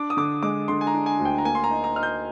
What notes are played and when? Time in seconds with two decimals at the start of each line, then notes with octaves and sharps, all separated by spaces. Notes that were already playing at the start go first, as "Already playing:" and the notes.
Already playing: D4 D6
0.10 D#6
0.17 D3 D6
0.43 G#3 D6
0.68 D3 C6
0.81 G#5
0.87 A#5
0.94 D4
1.06 G#5
1.19 D2
1.25 G5
1.38 A#5
1.45 A#3 G#5
1.55 C6
1.64 A#5
1.71 D#4
1.84 A#5
1.96 D#4 F6
2.03 G6